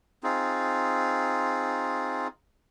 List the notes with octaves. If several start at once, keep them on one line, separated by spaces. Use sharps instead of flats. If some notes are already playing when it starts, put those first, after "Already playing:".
C4 D#4 F4 G#4